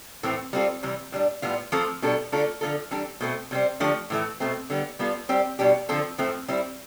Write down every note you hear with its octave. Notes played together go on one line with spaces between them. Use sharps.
A2 E3 A3 C4
G3 C4 F4 A4
C3 E3 G3
A2 G3 D4
A2 G3 B3 F4
F3 A3 C4 F4 A4
B2 G3 D4 A4
D3 A3 D4 F4 A4
D3 F3 C4 F4 A4
E3 G3 D4 A4
B2 A3 C4
C3 G3 C4
D3 F3 A3 D4 G4
A2 E3 A3
B2 A3 C4
D3 G3 B3
G3 B3 F4 A4
G3 C4 G4
B2 G3 D4 G4
D3 F3 C4 F4 A4
A2 F3 A3 C4
G3 C4 E4